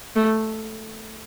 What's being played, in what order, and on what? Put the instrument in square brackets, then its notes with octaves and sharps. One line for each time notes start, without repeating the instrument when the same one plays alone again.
[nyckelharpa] A3